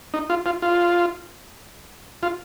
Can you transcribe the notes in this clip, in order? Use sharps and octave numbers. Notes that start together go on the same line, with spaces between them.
D#4
F4
F4
F4
F4